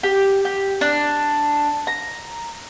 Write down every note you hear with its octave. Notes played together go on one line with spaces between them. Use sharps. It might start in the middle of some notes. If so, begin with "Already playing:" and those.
G4
G4
D4
A#5